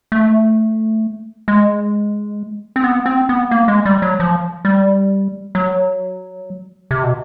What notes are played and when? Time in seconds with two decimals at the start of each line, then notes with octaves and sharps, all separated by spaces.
0.12 A3
1.48 G#3
2.76 C4
2.84 B3
3.06 C4
3.29 B3
3.51 A#3
3.68 G#3
3.85 G3
4.02 F#3
4.20 F3
4.65 G3
5.55 F#3
6.91 C3
7.04 B2